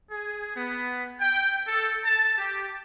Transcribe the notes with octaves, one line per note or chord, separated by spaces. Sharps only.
G#4
B3
G5
A4
A5
G4